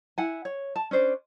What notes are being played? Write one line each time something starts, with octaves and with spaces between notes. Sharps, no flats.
E4 F#5 G#5
C#5
A5
C#4 D4 C5 D5